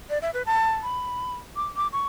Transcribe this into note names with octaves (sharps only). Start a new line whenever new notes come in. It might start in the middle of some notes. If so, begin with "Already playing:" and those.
D5
E5
B4
A5
B5
D6
D6
C#6